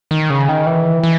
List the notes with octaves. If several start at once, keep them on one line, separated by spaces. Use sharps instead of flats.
D#3
C#3
D#3
E3
E3